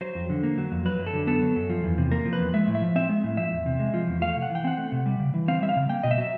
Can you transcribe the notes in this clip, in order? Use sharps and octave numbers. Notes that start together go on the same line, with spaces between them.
F#3 C5
F2
D3
A#3
F#3
F2
F#3 B4
F#2
A4
D3
B3 A4
F#3
F#2
F3
E2
C3
A#3 A#4
F3
B4
E2
G#3 E5
A2
E5
F3
C4 E5
G#3
A2
F3 E5
E2
C3
G#3
F3
E2
A3 F5
C3
F#5
E3
G5
C4 F#5
A3
C3
G3
C#3
E3
C4 F5
G3 E5
F5
C#3
A#3 G5
B2 D#5
E5
F#3